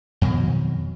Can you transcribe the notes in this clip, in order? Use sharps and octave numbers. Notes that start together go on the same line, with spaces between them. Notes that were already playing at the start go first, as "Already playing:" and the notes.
F2 B2 D#3 F#3